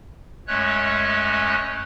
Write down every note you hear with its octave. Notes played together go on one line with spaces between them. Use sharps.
F#2 G#3 A3 C#4 C#5 F#6